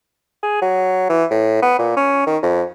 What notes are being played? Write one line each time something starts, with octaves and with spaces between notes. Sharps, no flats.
G#4
F#3
E3
A2
B3
A#2
C#4
D#3
F2